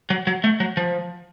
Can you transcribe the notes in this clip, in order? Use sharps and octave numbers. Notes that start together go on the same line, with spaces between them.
F#3
F#3
A3
F#3
F3